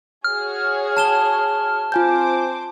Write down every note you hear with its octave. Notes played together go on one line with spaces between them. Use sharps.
F#4 G#4 C#5 F6
A5 E7 G7
C4 F4 C5 G#5 D6 G6